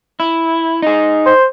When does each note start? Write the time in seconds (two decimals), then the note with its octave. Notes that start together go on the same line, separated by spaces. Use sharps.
0.20 E4
0.82 D#4 G#4
1.26 C5